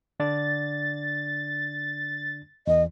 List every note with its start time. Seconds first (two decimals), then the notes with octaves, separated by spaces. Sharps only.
0.20 D3 D4 D5 A6
2.67 E2 E3 D#5